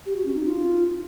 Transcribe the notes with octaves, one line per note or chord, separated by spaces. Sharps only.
G4
F#4
C#4
D#4
F4